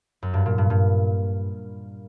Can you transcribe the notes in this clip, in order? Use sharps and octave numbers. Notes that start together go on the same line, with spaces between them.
F#2
G2
A#2
G2
G2